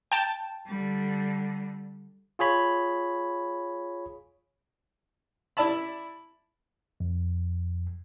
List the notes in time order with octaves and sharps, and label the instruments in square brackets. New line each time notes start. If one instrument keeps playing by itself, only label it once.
[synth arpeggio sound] G5 A5
[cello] D3 G3
[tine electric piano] F4 G#4 C#5 B5
[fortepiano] E4 D5 E5 A5 B5
[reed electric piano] F2